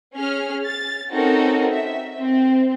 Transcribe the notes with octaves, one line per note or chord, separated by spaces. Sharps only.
C#4 G#4 F6
A6
C4 C#4 D#4 F#4 A4 A#4
E5
C4